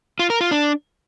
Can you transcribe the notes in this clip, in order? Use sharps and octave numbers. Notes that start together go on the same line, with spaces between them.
F4
A#4
F4
D4